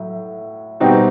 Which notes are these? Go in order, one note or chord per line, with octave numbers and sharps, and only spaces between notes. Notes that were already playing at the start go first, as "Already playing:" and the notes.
Already playing: A2 F#3
B2 G3 C4 D#4 F#4